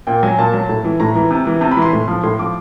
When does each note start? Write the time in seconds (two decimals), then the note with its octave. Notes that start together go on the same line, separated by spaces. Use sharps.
0.07 A#2 G5
0.23 F#3 G#5
0.38 A#2 A5
0.53 F#3
0.69 A2
0.84 E3
1.00 A2 A#5
1.15 E3
1.31 C3
1.47 E3
1.61 C3 A#5
1.71 B5
1.77 E3
1.82 C6
1.93 A2
2.08 F3
2.23 A2 C6
2.39 F3 D6